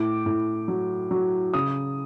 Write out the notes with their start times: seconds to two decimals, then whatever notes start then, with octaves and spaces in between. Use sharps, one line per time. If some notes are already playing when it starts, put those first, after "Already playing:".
Already playing: A2 D6
0.26 A2
0.68 F#3
1.11 F#3
1.54 C#3 D#6